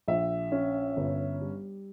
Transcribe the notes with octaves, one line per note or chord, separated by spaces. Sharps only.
A#1 E5
C#4
G1
G3